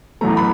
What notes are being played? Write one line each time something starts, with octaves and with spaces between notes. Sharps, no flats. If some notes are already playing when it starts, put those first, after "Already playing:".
A1 A2 F#3 A3 A#5
B5